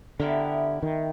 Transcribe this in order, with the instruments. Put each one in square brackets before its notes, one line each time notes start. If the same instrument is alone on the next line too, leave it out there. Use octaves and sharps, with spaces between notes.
[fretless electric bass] D3 [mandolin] B3 E4 G4 A#4
[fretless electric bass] D#3